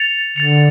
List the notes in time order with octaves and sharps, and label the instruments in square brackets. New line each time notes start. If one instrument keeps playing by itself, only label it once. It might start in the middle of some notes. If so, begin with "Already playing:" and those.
Already playing: [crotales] A6 C#7 F7
[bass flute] D3 [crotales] A6 C#7 F7